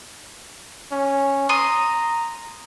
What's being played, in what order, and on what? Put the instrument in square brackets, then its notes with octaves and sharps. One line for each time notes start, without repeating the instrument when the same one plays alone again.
[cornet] C#4
[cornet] A#5 [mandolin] C6 D#6